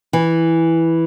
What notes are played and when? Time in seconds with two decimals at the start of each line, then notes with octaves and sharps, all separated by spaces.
0.13 E3